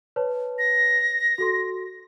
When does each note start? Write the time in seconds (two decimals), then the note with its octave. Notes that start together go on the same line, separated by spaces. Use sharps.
0.16 B4 C#5 A5
0.59 A#6
1.38 F#4 A4 C6